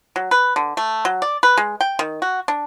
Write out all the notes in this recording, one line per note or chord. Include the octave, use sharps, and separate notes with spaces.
F#3
B4
D3
A3
F#3
D5
B4
G#3
G5
D#3
F#4
D4